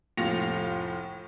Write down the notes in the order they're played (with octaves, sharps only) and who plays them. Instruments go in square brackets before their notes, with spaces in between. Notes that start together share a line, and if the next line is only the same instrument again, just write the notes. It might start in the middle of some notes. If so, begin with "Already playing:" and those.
[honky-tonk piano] F1 A2 F4 A#6 C#7 F7